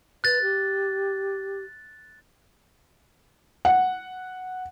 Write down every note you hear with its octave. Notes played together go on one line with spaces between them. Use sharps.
B4 F#6 A6
G4
F#5